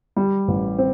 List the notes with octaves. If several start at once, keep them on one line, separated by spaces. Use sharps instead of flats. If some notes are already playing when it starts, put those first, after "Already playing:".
G3
A1
C4